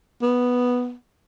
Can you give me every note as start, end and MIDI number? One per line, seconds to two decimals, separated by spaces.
0.22 0.93 59